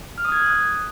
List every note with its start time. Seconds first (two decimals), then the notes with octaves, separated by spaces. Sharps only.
0.18 F6
0.25 D#6
0.32 G#6
0.39 F#6
0.46 D#6